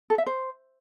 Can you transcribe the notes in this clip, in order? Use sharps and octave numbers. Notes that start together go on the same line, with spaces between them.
A4
E5
C5